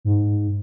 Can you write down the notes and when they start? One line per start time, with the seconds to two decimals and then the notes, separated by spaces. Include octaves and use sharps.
0.05 G#2